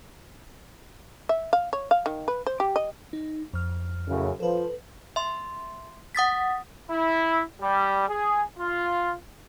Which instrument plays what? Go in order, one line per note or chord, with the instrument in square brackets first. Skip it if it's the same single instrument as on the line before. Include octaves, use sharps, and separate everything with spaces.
[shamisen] E5
F5
C#5
F5
D#3
B4
C5
G4
D#5
[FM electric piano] D#4
F2 F6
[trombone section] F#2 A2 C#3
[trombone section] F3 [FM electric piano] A4 B4
[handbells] E5 C6
F#5 D#6 A6 B6
[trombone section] E4
G3
G#4
F4